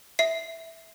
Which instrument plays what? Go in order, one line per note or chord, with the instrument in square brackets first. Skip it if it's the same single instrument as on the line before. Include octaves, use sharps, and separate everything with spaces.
[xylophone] E5 C7